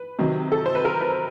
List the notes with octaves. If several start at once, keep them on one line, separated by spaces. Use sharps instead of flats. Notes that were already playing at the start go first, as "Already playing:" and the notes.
Already playing: B4
C3 D#3 F#3
A4
C5
B4
A#4
B4